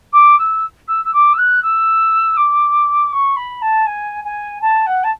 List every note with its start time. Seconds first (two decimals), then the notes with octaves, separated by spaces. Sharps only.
0.13 D6
0.38 E6
0.87 E6
1.04 E6
1.13 D6
1.33 E6
1.38 F#6
1.62 E6
2.36 D6
3.12 C#6
3.36 B5
3.61 A5
3.86 G#5
4.24 G#5
4.61 A5
4.86 F#5
5.03 A5